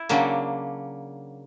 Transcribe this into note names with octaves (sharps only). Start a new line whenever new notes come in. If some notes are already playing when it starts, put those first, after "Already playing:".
Already playing: E4
C#3 F#3 A#3 D4